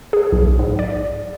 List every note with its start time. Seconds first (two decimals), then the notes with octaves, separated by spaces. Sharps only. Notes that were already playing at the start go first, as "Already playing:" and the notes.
0.13 G#4
0.32 B1
0.59 G#2
0.79 D5